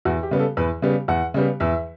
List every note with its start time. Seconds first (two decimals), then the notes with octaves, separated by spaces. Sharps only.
0.05 E2 F#4
0.23 G4
0.31 C#3 G3 B3
0.39 A4
0.57 E2 B4
0.82 C#3 G3 B3
1.08 E2 F#5
1.34 C#3 G3 B3
1.60 E2 E5